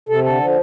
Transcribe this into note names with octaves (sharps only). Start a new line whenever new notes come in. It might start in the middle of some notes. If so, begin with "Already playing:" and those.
C3 A4
D3 A4
F3